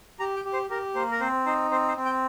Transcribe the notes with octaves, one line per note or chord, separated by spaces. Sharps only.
G4 A#5
G5
G4
C5
G4 A#4
A#3 C5
A#4
C4 C5
D#4 C5
C4 C5
C5
C4
G5